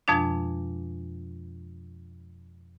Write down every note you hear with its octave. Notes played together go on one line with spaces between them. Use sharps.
F2 B2 F3 G#3 D4